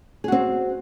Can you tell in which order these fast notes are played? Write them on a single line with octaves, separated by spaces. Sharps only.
G#4 F#4 C4